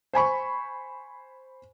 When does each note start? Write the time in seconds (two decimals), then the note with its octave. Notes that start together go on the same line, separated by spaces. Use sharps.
0.13 C5 G#5 B5 C#6